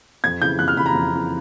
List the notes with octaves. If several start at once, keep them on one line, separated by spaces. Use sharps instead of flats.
F2 G#6
C#3 E3 G6
F2 F#6
F6
C#3 E3 B5
A#5
F2
C#3 E3